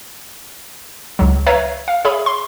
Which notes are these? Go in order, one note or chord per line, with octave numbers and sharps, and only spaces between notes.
C#2 F#3
B4 C#5 E5 F5 A#5
F5
G#4 C#5 E5 B5
C6